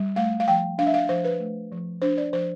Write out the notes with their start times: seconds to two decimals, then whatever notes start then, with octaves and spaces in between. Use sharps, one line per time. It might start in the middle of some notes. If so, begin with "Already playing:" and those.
Already playing: G3
0.16 A3 F5
0.40 F5
0.48 F3 G5
0.78 D4 F5
0.87 E5
0.94 F5
1.09 F3 C5
1.24 B4
1.40 A3
1.72 F3
2.02 D4 C5
2.18 D5
2.33 F3 C5